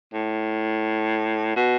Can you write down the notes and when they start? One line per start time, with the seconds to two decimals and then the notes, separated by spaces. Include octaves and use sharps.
0.14 A2
1.56 B2